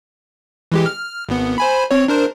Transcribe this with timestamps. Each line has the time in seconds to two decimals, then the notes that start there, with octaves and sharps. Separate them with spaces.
0.72 E3 G#3 G4
0.86 F6
1.29 G#1 B3
1.58 C5 G#5 B5
1.91 C4 C#5
2.08 D4 A#4 C5